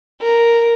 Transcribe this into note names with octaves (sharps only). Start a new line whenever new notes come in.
A#4